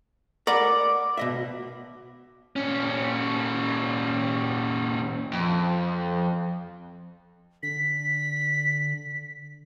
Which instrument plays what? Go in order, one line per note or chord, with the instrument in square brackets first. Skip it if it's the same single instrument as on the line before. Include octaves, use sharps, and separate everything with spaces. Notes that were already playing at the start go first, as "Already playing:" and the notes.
[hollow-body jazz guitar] A#4 F#5 B5 [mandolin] D5
[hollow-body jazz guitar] B2 D#5 E5
[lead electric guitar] A#2 C#4
[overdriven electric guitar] F2
[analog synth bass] D3 [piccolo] B6